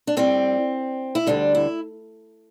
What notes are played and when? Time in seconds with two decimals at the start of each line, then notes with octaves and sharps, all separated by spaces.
0.07 D4
0.17 A2 G3 C4
1.15 E4
1.27 D2 D3 G3 D4
1.55 E4